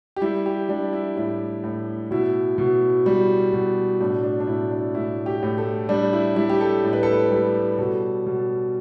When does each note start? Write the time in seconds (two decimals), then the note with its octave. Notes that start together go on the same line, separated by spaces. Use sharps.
0.16 G4
0.22 G3 E4
0.46 G4
0.69 G3 D4
0.93 E4
1.16 A2 E4
1.64 A2
2.11 B2 E4
2.58 B2
3.06 G3
3.53 B2
4.00 A2 D4
4.23 D4
4.40 D4
4.47 A2 E4
4.71 D4
4.95 A2 E4
5.26 G4
5.43 A2
5.58 A4
5.89 G3 D4
6.13 E4
6.36 G3 E4
6.50 G4
6.61 A4
6.84 A2
6.93 B4
7.03 A4
7.13 B4
7.32 G3 A4
7.79 B2 A4
8.26 B2